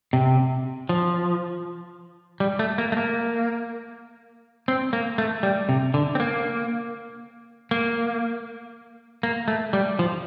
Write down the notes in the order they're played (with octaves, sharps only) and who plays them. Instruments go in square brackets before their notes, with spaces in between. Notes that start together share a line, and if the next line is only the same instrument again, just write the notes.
[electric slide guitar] C3
F3
G3
A3
A#3
A3
A#3
C4
A#3
A3
G3
C3
D3
C4
A#3
A#3
A#3
A3
G3
F3